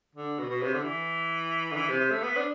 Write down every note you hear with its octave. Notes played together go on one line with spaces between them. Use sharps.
D3
B2
B2
C3
D3
E3
D3
E3
C3
C3
A3
B3
D4